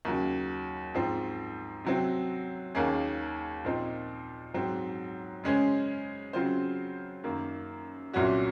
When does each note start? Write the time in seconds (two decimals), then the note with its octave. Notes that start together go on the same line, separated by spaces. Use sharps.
0.05 D#2 C#3 F#3
0.94 G#2 F3 C4
1.85 C3 F#3 C4
2.75 D#2 D#3 A#3 C#4 G#4
3.65 A#2 F3 C4 D#4
4.54 G#2 F#3 C4
5.44 C#3 G#3 C#4 G#4 C5
6.33 C#3 F#3 C4 F4 C5
7.24 F#2 D#3 A#3
8.13 C2 A#2 F#3 C#4 F#4